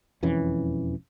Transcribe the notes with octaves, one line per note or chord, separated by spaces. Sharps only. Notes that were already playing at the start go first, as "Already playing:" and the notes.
E1 F2 E3 C#4